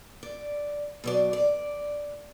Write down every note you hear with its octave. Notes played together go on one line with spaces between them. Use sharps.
D5
B2 F#3 D5
D5